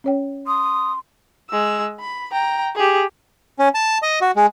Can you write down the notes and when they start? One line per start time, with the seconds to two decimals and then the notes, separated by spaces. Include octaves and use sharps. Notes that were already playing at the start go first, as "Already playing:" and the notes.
0.04 C#4 C#5 G5
0.47 C6 D#6
1.50 G#3 E6
2.00 B5
2.32 G5 A#5
2.76 G4 G#4
3.59 C#4
3.75 A5
4.02 D#5
4.21 F#4
4.36 G#3